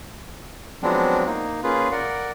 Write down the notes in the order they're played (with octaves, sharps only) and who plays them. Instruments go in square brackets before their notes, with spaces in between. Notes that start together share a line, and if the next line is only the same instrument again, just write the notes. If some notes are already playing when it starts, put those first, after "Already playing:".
[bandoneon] F3 F#3 G#3 B3 C4 D4
A#3 D#4
A#3 C#4 F4 G#4 B4
A#4 D5 F#5